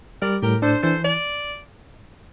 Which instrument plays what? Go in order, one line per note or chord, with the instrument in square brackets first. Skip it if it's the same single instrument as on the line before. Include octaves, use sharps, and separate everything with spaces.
[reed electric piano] G3 [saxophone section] A#4 D5
[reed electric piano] A2 [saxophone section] G4 A#4
[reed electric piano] D4 [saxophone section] A4 C5
[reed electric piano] E3 [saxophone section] A4 C5
[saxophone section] D5